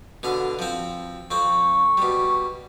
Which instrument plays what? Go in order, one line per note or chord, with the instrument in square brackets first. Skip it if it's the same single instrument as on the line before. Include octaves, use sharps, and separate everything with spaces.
[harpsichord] B2 D3 F5
F3 C4
[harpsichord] F2 C4 [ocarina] C#6
[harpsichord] B2 G3